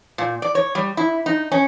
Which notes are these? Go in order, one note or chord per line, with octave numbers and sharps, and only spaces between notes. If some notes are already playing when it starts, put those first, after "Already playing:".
A#2
D5
C#5
G3
E4
D#4
C#4